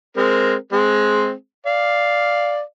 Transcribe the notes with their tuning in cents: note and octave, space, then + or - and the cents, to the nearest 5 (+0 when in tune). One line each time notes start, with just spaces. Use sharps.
G#3 +0 C4 +0 A#4 +0
G#3 +15 C4 +0
D5 +0 F5 +0